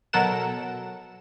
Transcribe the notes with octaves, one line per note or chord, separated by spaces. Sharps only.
B2 F#3 A4 A#4 F#5 E7